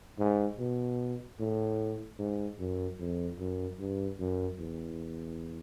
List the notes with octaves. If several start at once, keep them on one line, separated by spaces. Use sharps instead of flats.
G#2
B2
A2
G#2
F#2
F2
F#2
G2
F#2
E2